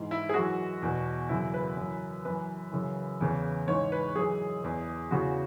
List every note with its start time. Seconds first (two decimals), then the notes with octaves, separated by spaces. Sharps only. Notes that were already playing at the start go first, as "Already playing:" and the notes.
Already playing: G#2 E3
0.11 E4
0.29 G#4
0.34 F#2 E3 F#4
0.82 E2 B2
1.29 F#2 C#3 E3 E4
1.54 B4
1.77 F#2 E3
2.25 F#2 E3 B4
2.72 F#2 C#3 E3
3.21 E2 C#3 E3
3.68 G#2 E3 C#5
3.92 B4
4.15 F#2 E3 G#4
4.63 E2 E3
5.11 E2 C#3 E3 F#4